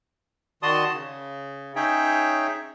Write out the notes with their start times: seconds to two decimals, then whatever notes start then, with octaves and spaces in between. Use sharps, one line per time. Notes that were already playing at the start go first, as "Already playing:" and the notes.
0.63 D#3 F#4 D5 A5 C6 D#6
0.93 C#3
1.76 C#4 D#4 G#4 C#5 E5 G5